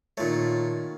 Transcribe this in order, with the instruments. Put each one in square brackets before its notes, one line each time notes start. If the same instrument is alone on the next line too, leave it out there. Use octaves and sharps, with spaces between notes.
[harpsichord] A#2 A3 [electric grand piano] D#3 F4 C#5